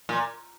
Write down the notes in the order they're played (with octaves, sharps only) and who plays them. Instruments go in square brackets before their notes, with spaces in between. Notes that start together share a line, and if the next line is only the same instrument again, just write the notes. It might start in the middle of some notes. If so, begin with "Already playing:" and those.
[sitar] A#2